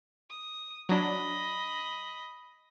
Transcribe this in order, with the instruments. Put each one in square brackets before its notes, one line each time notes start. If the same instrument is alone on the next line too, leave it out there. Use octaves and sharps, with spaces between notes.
[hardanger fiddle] D#6
[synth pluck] F#3 D4 [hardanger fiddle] D#5 B5